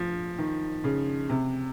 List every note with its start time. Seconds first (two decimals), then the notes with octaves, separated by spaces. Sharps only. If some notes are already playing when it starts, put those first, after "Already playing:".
Already playing: F3
0.38 D#3
0.84 C#3
1.29 C3